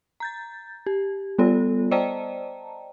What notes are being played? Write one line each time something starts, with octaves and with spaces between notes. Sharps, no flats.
A#5 G6 A6
G4
G3 B3 F4 A4 D5
C5 D5 D#5 G5 A5 A#5